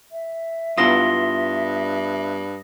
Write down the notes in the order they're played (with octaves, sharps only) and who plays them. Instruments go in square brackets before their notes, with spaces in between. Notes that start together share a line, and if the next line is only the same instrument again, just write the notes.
[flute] E5
[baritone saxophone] G2 [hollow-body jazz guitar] B3 E4 F4 [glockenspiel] D#6 A#6 G7